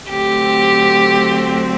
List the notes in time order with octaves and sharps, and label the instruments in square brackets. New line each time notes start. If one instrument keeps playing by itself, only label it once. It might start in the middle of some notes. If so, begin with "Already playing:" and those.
[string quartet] D3 F#3 A3 C4 G4